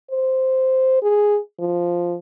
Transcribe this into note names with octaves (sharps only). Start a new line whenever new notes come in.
C5
G#4
F3